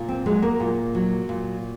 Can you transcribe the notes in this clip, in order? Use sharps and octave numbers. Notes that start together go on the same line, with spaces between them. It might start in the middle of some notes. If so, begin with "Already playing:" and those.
Already playing: A#2
C4
F#3 G#3
A#3
A#2
F#3
A#2